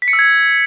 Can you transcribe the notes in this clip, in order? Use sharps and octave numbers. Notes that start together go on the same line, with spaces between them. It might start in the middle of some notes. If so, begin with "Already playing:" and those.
B6
C#7
E6
G#6